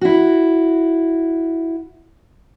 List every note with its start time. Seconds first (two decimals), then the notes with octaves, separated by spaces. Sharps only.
0.01 E4 F#4